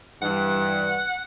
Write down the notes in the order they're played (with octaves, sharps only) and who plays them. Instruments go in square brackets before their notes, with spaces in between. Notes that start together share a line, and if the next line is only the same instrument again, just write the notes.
[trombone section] G2 E3 [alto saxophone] F#5